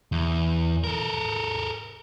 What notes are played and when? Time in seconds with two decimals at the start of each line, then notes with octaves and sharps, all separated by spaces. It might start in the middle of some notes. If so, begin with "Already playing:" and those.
0.12 E2
0.84 A4 A#4